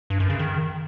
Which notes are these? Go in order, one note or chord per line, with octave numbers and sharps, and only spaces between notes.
G2
F#2
C#3
D#3